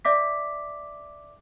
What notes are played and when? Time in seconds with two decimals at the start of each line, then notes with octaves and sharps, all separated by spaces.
0.05 D5 E5 D6 B6